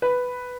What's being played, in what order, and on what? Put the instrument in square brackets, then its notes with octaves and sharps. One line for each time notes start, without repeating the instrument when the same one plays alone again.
[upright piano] B4